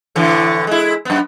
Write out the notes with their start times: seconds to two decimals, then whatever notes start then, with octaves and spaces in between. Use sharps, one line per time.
0.16 A2 D3 E3
0.67 G#3 E4
1.05 F#2 B3